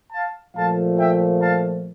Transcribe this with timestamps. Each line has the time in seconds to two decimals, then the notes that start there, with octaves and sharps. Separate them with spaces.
0.13 F5 A5
0.56 A#2 F3 A3 F5 A5
0.98 E5 G5
1.41 F5 A5